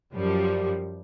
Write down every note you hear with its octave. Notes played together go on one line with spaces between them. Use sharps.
F#2 F3 G3